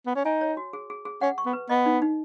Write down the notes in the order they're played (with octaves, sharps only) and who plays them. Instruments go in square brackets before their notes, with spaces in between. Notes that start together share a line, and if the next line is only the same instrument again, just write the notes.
[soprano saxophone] B3
C#4
[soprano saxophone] D#4 [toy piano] G#5
[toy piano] C#5
F#4
G#4
G#4
G#4
[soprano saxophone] C#4 [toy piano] F#5
[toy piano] C#6
[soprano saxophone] B3
[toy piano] B4
[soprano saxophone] B3 [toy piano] D#5
[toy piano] D#4
D#4